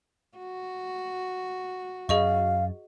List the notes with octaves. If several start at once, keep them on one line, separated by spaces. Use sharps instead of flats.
F#4
F#2 G#4 D#5 F5 C#6